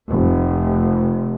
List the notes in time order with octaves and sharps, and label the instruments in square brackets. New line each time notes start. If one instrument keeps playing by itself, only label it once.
[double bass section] F1